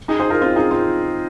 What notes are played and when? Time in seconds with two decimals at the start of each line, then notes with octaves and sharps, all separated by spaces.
0.08 D#4 G#4
0.20 G#4 C5
0.30 F4 A#4
0.41 C4 F4
0.56 D#4 G#4
0.71 C4 F4